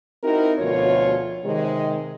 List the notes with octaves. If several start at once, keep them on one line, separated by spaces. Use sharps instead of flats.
C4 D#4 E4 F#4 A#4
D2 B2 F3 F4 C#5
C3 D#3 G#3